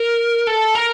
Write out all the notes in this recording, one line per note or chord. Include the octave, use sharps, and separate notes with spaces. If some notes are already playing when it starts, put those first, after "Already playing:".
Already playing: A#4
A4
A#4